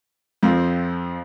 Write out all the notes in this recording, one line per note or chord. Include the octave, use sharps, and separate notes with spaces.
F2 F3 C4